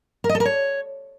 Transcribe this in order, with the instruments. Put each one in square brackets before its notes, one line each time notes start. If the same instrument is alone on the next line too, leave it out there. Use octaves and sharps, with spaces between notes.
[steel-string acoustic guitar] A#4
D#5
A4
A#4
C#5